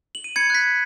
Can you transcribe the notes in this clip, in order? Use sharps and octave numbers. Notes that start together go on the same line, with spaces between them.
F#7
D#7
B5 G#6 C#7
F#6 B6
F#6